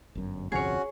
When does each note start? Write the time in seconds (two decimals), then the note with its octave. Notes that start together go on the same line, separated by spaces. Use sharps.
0.15 G1 F#2
0.52 G1 C2 F2 C#4 F#4 G#4 C#5